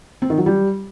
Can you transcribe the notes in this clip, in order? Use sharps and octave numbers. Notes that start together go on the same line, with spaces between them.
C4
D#3
F#3
G3